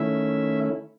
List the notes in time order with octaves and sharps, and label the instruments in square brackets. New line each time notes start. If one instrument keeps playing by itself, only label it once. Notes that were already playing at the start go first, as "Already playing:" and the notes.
Already playing: [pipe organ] D#3 A3 C#4 E4 E5